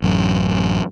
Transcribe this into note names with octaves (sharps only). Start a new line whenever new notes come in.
A1 F#2